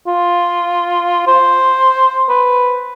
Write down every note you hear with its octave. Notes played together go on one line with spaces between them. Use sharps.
F4
C5
B4